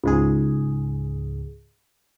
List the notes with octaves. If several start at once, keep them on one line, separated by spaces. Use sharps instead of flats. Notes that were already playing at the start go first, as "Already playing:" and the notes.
C#2 G#2 G#4